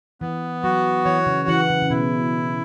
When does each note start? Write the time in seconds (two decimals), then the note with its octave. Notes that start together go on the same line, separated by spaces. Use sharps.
0.21 E3 B3
0.64 F#3 F#4
1.05 E3 C#5
1.26 C#3
1.48 E3 F#5
1.70 C#3
1.82 C#3
1.90 B2 E4